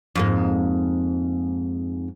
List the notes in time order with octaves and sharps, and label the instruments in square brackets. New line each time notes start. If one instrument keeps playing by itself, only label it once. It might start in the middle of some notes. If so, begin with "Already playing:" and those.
[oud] F2 G#2 A#3